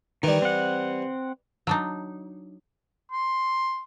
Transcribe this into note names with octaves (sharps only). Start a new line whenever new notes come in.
D#3 E3 G3
C4 F#5
F#3 D4 D#4
C6